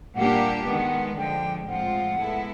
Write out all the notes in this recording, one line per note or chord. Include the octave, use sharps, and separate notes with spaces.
A#2 G3 A#3 D4 G4 F#5
D#3 G#3 B3 F#5
D3 F3 G#3 G5
A2 F3 G#3 C4 F4 F#5
G#3 B3 E4 A4